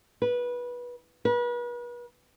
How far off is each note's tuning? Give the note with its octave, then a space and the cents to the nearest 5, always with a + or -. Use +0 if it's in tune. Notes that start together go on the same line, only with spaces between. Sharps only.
B4 -20
B4 -40